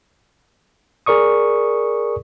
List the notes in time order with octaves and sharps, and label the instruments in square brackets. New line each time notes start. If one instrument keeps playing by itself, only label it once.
[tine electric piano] G#4 A#4 D5 C#6 D#6